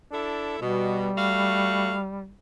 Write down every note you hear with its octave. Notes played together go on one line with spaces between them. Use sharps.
D4 E4 A4
B2 G3
A3 F#4 F5